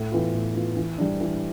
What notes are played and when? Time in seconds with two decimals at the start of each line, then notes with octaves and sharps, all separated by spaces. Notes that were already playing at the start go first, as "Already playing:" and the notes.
Already playing: A2
0.12 E3 B3 F4
0.33 A2
0.55 E3 B3 F4
0.77 E3
0.98 G3 D4
1.21 E3